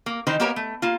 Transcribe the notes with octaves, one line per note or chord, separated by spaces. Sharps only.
A#3
D#3 E3 D#4 C5
A#3 B3 G4 A#4 C#5 G#5
A3
A#3 F4